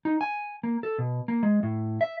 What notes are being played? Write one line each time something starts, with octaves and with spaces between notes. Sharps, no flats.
D#4
G#5
A#3
A4
B2
A#3
G#3
A2
E5